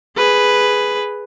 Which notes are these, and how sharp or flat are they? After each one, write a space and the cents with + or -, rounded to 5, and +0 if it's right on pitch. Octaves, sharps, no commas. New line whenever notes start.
G#4 +0 B4 +5